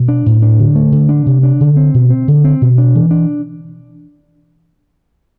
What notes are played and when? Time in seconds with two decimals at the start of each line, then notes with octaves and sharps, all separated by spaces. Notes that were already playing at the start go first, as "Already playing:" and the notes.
Already playing: B2
0.08 D4
0.26 A2
0.42 D4
0.59 D3
0.75 A3
0.92 D3
1.09 D4
1.26 C3
1.43 D4
1.61 D3
1.76 C4
1.94 B2
2.10 C4
2.28 D3
2.44 C4
2.61 B2
2.78 D4
2.95 E3
3.11 D4